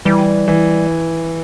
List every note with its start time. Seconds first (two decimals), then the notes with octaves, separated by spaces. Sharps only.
0.05 E3 G3
0.48 E3